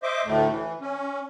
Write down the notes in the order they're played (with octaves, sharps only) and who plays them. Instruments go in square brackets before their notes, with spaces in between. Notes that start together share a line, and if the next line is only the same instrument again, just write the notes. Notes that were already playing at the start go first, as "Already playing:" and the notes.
[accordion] C5 D#5 E5 D6
D2 A2 A3
E3
C#4